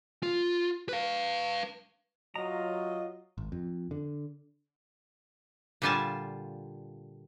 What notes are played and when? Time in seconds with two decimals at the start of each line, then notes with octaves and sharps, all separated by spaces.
0.23 F4
0.89 B4 F5
2.36 F#3 F4 D#5 A#5
3.38 G#1
3.52 F2
3.91 D3
5.82 A#2 D3 G3 F4 G#5 A5